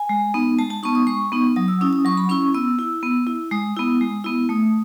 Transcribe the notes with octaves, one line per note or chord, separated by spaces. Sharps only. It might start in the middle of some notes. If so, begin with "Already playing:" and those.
Already playing: G#5
G#3
B3 D#4
G#3 A5
A5
B3 D#4 C#6
D#6
G#3 C#6
B3 D#4
F#3 D#6
E6
C#4 E4 D#6
D#6
F#3 C#6
B5
C#4 E4 C#6
B3 E6
E4
B3
E4
G#3 D#6
B3 E4
G#3
B3 E4
A3 D#6